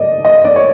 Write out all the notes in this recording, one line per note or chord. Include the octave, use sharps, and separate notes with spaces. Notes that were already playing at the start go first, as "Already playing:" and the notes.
Already playing: D5 D#5
D#5
D5
C#5